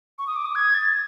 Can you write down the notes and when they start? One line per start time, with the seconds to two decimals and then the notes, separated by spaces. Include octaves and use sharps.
0.19 C#6
0.27 D#6
0.36 D6
0.45 D#6
0.55 G#6
0.74 A6